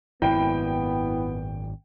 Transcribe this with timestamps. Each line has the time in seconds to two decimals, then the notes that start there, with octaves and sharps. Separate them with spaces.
0.22 G#1 F#2 A#2 B3 E4 G5